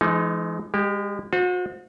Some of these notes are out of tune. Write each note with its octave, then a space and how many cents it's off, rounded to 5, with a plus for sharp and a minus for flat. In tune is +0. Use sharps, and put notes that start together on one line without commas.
E3 +45 G#3 +30 D#4 +0
G#3 -35 G4 +0
F#4 -40 C5 +0